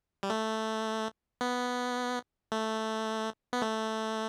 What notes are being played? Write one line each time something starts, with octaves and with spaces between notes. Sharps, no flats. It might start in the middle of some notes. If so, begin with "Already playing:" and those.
G3
A3
B3
A3
B3
A3